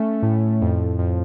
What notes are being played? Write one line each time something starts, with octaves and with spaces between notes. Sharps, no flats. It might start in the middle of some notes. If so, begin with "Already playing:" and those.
Already playing: A3 C#4
A2
F2
F2